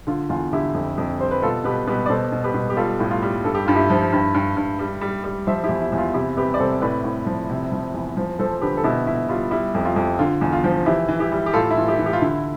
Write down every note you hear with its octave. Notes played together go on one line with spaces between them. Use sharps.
D3 F4
E2 F4
D3 E4 G4
F2
F2
G3 C5
B4
B2 F4 A4
B2 G4 B4
B2 G4 B4
D5
B2 A4 C5
B2
G4 B4
B2
G4
G3 F4 A4
A2
F4
G3
G2 A4
G4
G2 F4
E4 G4
F3
G2
G2
G2
G3
G3
G3
F3 C5 E5
E4 G4
E2
E4
E2
F4
C3 E4 G4
C3 G4 B4
D5
C3 A4 C5
A2 B4 D5
A2
F3
C3
F3
E2
F3
F3 A4 C5
D3 G4 B4
A4
B2 E4 G4
B2 E4
G3 F4
G3 E4
F2
F4
F2
D3 F4
E2
F4
F3
E3 E4 G4
E3
E4 G4
G3
G4
A2 F4 A4
E4
E3 F4
E4 G4
E3
G4
F4
D3 E4